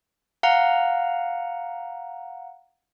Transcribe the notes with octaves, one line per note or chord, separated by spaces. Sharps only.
F5 F#5 A#5